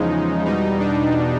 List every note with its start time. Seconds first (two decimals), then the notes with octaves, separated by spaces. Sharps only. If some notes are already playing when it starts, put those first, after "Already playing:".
Already playing: E2 C#3 F3 G#3 D#4
0.45 E2 B2 G3 D#4
0.80 D4